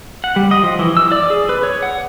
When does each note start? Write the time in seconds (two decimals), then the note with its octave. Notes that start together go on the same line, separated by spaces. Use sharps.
0.24 F#5
0.36 G3
0.51 D#5
0.63 F3
0.79 E3
0.97 E6
1.12 D5
1.30 G#4
1.49 B4
1.63 C#5
1.82 F#5